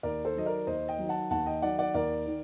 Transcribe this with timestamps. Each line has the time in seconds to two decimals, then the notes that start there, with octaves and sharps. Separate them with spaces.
0.03 D#2 A#4 D5
0.25 A4 C5
0.35 D#3 F#3 D#5
0.46 A#4 D5
0.67 D#2 C5 D#5
0.88 D#5 G5
0.99 D#3 F#3
1.09 F#5 A5
1.31 D#2 F#5 A5
1.46 D#5 G5
1.62 D#3 F#3 D5 F#5
1.79 D5 F#5
1.94 D#2 A#4 D5
2.27 D#3